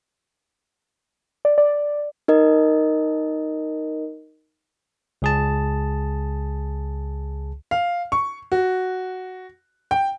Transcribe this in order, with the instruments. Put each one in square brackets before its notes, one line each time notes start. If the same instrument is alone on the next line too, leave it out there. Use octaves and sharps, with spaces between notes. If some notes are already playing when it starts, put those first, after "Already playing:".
[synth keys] D5
D5
[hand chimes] D#4 A#4 D#5
[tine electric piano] C#2 G#4 A5
[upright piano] F5
C#6
F#4
G5